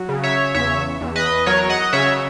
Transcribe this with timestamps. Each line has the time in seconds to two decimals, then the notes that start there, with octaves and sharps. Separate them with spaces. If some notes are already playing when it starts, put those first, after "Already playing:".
Already playing: F#3
0.09 C#3
0.23 C#5 E5
0.54 E2 C#5 E5
1.01 E2
1.16 B4 D#5
1.46 F#3 A#4 C#5
1.70 D#5 F#5
1.93 C#3 C#5 E5